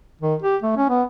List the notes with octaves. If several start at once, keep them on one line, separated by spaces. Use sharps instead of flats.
D#3
G4
A3
C#4
B3